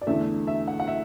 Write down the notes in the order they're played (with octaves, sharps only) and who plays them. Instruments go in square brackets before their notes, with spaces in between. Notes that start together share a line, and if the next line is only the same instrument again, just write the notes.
[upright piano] D5
E2 D3 A3 E5
E5
F#5
F#5
E5